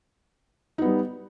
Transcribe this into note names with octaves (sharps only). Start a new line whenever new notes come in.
G3 B3 D#4